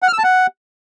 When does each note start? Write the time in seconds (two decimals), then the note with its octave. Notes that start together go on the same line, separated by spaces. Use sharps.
0.02 F#5
0.08 F6
0.13 E6
0.18 A5
0.24 F#5